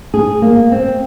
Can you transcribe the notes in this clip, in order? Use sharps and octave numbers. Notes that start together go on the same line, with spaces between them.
G#4
A#3
C4